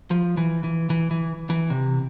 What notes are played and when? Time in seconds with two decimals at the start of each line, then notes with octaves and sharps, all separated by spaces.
0.11 F3
0.37 E3
0.64 E3
0.90 E3
1.11 E3
1.50 E3
1.70 C3